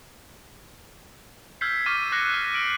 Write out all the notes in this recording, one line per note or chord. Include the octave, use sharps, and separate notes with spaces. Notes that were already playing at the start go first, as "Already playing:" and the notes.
E6 F6 G6 G#6 B6 C7
C#6 D6 F6 G6 A6 D#7
D6 E6 F#6 A#6 C7 C#7
F6 D#7
F6 D7 F#7